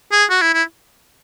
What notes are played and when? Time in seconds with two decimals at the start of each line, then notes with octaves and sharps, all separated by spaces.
0.12 G#4
0.30 F#4
0.41 E4
0.54 E4